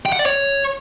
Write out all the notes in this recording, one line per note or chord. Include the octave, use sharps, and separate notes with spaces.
G5
F#5
D5
C#5